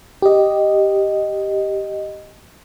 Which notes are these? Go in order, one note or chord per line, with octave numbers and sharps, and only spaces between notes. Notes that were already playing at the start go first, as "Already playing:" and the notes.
G4 D#5